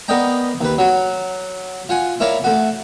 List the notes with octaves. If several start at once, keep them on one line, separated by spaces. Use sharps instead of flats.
B3 A#4 D5 D#5 G5 A#5
D#2 B4
F#3 F#4
F4 F#5 G#5
E4 A#4 C#5 D5 F5
A3 F#4